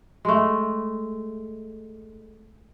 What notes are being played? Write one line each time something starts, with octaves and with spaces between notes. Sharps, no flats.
G#3 A3